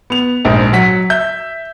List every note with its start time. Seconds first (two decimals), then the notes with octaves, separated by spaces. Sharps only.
0.10 B3 F7
0.45 A#1 G#2
0.73 F#3 F#5 B6
1.10 E5 G6